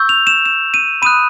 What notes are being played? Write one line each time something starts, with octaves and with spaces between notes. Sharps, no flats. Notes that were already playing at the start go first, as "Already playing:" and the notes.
Already playing: C#6 E6 G6
F7
E7
E7
D#7
B5 D#6 F#6 D#7